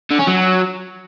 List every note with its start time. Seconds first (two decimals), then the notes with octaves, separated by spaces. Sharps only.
0.11 D3
0.19 C#4
0.27 F#3